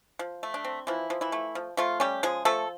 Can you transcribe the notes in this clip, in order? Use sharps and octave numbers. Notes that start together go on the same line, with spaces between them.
F3
A3
D4
C4
E3 F3 E4
F3
E3 E4
A3
F3
F3 A3 F4
G3 C#4 G4
F3 G#3 G#4
F3 A3 A4